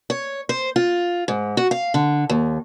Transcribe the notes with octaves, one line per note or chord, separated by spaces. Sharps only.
C#5
C5
F4
G#2
F#4
F5
D3
D#2